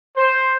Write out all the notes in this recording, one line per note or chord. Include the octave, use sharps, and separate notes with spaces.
C5